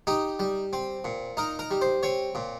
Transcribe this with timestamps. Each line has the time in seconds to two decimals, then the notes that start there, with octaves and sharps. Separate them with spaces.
0.07 D#4 G4
0.39 G3
0.73 C4
1.05 A#2
1.37 D#4 A#4
1.59 A#4
1.71 G3
1.81 C5
2.03 C4 C#5
2.35 A#2